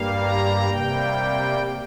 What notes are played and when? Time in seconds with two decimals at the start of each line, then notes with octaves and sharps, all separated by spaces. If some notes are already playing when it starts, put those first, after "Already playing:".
Already playing: G2 G3 A#3 F5
0.23 A#5
0.68 C3 G3 A#3 G5